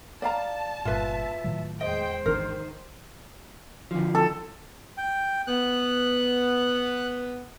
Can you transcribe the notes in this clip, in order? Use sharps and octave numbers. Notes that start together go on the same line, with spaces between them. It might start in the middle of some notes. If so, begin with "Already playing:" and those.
D5 F5 A5 A#5
G1 G2 A#2 F4 B4 E5
A2 D#3 F#3
E2 G#3 C5 D#5 G5
G#1 D#3 E3 D4 A#4
D3 F3
A4
G5
B3 F#6